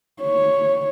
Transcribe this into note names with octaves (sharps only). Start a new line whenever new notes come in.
C#5